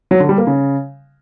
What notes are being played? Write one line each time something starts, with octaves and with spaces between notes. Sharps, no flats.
F#3
D3
G3
A#3
C#3